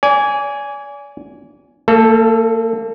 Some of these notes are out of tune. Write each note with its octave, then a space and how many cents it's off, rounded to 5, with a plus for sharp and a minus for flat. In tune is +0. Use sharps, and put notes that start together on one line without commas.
D5 -35 G#5 +0
A#3 -40 A4 +0